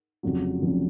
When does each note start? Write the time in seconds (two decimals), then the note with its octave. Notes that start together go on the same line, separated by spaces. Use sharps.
0.23 F1 F2 C#3 F#3
0.62 F1 F2 C#3 F#3